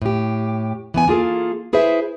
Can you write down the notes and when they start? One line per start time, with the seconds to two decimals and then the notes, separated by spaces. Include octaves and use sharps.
0.02 A2 G4
0.94 E3 B3 G#5
1.08 A#3 F4 G#4 A4
1.73 E4 G#4 B4 C5 E5